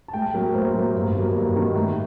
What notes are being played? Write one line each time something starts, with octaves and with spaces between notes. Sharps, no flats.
A5
A2 G5
F#3 A#3 A#4
A2 C5
F#3 A#3
G2
D#3 F#3 A#3
G2
D#3 F#3 A#3
A2